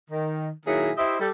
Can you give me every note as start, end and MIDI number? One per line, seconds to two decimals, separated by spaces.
0.10 0.50 51
0.66 0.91 46
0.66 0.91 51
0.66 0.91 54
0.66 0.91 58
0.66 0.91 64
0.66 0.91 68
0.97 1.19 64
0.97 1.19 67
0.97 1.19 72
0.97 1.19 75
0.97 1.19 76
1.20 1.30 55
1.20 1.30 69